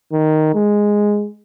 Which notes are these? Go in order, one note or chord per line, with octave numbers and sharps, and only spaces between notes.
D#3
G#3